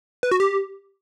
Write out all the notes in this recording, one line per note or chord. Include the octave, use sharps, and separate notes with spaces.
B4
F#4
G4